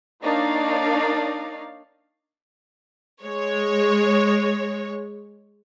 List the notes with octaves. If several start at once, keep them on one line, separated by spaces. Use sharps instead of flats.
A#3 D4 D#4 C#5 D5 F5
G#3 C#5